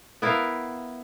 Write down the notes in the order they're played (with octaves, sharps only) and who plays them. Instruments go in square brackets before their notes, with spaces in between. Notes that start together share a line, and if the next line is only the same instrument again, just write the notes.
[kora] B3 E4 A#4 F5